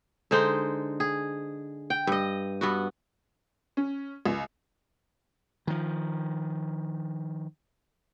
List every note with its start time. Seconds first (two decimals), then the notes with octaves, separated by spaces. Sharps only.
0.31 D3 G#3 D#4 C5
1.00 G#4
1.90 G5
2.07 G2 D#5
2.61 G2 B3 F#4
3.77 C#4
4.26 C#2
5.67 D#3 F3